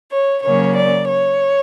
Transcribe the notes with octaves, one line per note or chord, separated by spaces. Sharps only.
C#5
C#3 F#3 A#3 C#4 C#5
D5
C#5